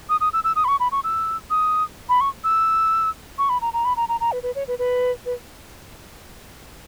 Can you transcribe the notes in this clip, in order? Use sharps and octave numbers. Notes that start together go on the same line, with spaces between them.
D#6
D#6
E6
E6
D#6
B5
C#6
B5
C#6
E6
D#6
B5
C#6
E6
C#6
B5
A#5
A#5
B5
A#5
A#5
A#5
B4
B4
C#5
B4
B4
B4